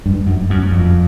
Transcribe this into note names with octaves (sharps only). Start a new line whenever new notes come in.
G2
F#2
F#2
F2